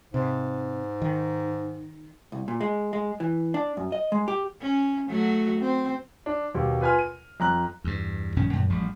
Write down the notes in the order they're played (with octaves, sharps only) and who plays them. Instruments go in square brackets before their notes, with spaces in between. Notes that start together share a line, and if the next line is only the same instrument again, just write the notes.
[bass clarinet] G#2 [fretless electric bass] C3
[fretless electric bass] D#3
[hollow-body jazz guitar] C2
A#2
G#3
G#3
E3
D4
F#2
D#5
G#3
G4
[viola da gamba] C#4
F#3 A3 F#4
C4
[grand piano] D4
D#2 B2 G4
F4 B4 G#5 C6 F6
D#7
F2 A#5 F#6
[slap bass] E2 G2
A#1 G2 D#3 C#4
F#2 A#2 D#3
A1 F3 G3 G#3